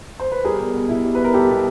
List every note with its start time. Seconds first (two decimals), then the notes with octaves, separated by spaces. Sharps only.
0.20 C5
0.32 B4
0.44 G3 G#4 A#4
0.59 B2
0.74 B2
0.89 B2 E4
1.04 G3
1.15 B2 B4
1.24 A#4
1.34 G3 G4 A4
1.49 B2